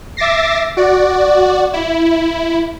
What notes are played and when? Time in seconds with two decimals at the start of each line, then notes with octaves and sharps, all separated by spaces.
0.17 E5 D6 A6 A#6 C7
0.77 F#4 D5
1.73 E4